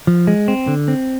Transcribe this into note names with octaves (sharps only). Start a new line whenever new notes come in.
F3
G#3
C4
D3
C4